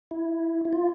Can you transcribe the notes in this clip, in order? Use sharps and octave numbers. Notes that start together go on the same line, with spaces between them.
E4
E4
F4